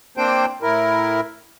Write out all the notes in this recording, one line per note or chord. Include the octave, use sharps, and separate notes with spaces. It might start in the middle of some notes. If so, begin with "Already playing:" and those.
A#3 C4 D4 C5 G5
A2 E4 A#4